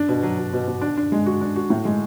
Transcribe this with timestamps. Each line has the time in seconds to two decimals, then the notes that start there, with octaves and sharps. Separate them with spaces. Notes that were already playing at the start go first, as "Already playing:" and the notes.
Already playing: D4
0.09 B2
0.23 F#3
0.38 F#3
0.53 B2
0.68 B2
0.81 D4
0.97 D4
1.12 G#3
1.26 F#4
1.41 D4
1.56 F#4
1.70 A2
1.85 G#3